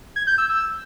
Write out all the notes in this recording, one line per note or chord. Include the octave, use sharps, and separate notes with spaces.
G#6
G6
E6
E6